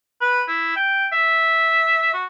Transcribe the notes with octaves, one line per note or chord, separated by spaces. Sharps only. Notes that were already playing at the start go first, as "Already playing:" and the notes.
B4
E4
G5
E5
F#4